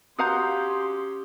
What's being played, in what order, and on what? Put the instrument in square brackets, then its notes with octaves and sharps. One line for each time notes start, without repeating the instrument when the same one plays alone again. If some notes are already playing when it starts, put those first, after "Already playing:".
[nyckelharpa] C#4 G4 [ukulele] F#4 F5 A#5 [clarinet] C6 [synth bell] D#6 G6